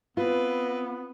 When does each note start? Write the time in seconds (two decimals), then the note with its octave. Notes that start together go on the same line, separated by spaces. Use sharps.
0.17 B3 C4 F4 B4